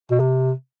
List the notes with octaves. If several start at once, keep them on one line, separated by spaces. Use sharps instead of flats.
B2
C3